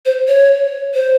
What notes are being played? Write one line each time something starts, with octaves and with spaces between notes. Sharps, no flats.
C5
C#5
C5